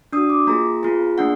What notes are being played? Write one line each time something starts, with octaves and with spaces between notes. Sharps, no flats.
D4 F#4 D#6
D6
A#3 F4 G#4 A#5
B3 F4 G#4
A#3 D4 G#4 F#5